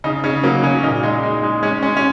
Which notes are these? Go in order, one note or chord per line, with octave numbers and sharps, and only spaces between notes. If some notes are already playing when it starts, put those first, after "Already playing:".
C#3 D#4
C#3 C#4
F#3 A#3
C#3 C#4
A#2 D#4
G#3 D#4
G#3
G#3
G#3 C#4
G#3 C#4
C#4